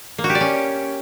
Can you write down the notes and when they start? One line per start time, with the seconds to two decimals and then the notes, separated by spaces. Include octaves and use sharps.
0.18 A#3
0.24 F#4
0.30 G4
0.35 D5
0.41 C#4